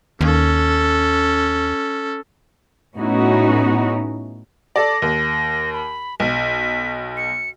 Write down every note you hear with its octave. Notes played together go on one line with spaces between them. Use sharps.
D#2 C#4 A4
A2 B3 C#4 D#4 E4 F#4
A4 D5 A#6
D#2
B5
B1 B6
C#7